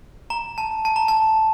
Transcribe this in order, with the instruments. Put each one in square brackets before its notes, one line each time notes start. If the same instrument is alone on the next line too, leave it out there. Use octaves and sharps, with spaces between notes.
[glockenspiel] A#5
A5
A5
A#5
A5